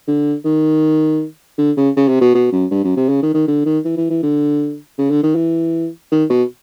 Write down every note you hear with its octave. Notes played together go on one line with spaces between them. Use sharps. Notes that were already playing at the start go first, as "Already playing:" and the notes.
D3
D#3
D3
C#3
C#3
C3
B2
B2
F#2
G2
F#2
C3
C#3
D#3
D#3
D3
D#3
E3
E3
E3
D3
C#3
D3
D#3
E3
D#3
B2